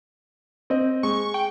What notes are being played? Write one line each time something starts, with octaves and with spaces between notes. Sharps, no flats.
C4 D#5
G#3 C#6
G5